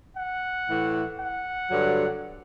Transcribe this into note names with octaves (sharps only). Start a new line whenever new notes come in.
F#5
A2 E3
F#5
G2 D3 F#3